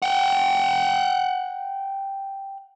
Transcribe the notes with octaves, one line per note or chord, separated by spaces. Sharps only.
F#5 G5